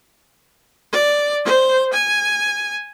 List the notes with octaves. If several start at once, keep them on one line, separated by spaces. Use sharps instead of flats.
D5
C5
G#5